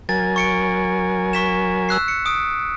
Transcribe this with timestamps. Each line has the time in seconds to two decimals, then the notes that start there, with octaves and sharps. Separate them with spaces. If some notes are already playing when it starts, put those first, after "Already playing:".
0.09 F#3 A#4 G#5 A6
0.36 C#6 C#7 D7
1.33 C#6 B6 E7
1.89 E6 F#6 C7
2.08 C#7
2.26 D#6 D7